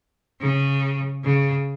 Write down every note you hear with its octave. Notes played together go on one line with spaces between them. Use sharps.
C#3
C#3